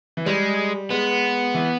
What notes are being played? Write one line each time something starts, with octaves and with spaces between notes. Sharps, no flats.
E3
G3 G#3
G#3 B3
E3